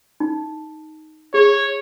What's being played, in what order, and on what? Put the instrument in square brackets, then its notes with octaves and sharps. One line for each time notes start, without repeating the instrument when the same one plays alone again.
[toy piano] D#4
[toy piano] G#4 [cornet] C#5